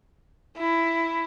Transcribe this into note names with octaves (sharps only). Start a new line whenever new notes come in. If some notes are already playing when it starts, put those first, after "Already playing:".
E4